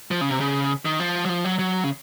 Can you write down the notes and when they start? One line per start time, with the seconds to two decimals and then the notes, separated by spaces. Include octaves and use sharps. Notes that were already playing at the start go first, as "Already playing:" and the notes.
0.11 F3
0.21 C#3
0.31 C3
0.40 C#3
0.85 D#3
1.00 F3
1.25 F#3
1.29 F3
1.44 F#3
1.59 F#3
1.84 C#3